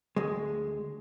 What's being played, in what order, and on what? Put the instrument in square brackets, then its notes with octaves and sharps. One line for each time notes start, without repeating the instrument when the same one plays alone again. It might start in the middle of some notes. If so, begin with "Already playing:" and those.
[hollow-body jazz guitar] D2 G#3